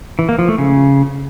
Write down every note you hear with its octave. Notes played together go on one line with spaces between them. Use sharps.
E3
A#3
F3
A3
C#3